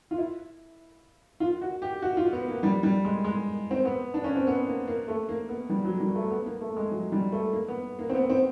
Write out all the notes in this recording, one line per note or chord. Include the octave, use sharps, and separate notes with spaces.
F4
E4
F4
F#4
G4
F#4
F4
B3
A#3
G3
G3
G#3
G#3
C4
B3
D4
C#4
C4
B3
A#3
A#3
A3
A#3
B3
G3
F#3
G3
A3
B3
A#3
A3
G#3
F#3
G3
A3
A#3
B3
A#3
C4
B3
C4